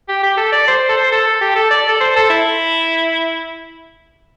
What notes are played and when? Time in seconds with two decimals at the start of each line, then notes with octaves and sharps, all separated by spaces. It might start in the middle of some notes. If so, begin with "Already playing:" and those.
0.08 G4
0.23 G4
0.37 A4
0.52 D5
0.68 C5
0.89 A4
0.97 C5
1.12 A4
1.27 A4
1.41 G4
1.56 A4
1.71 D5
1.89 A4
2.01 C5
2.16 A4
2.30 E4